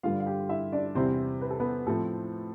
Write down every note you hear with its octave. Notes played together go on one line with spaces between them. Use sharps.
G2 D3 G3 F4 F5
F5
G4 G5
E4 E5
D4 D5
E2 C3 G3 C4 E4 C5
B4
A4
B3 B4
A2 F3 C4 E4 A4